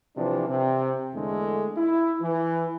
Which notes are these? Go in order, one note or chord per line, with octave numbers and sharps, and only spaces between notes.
C3 E3 F3 D4
C3
E2 D3 G#3 A3
E4
E3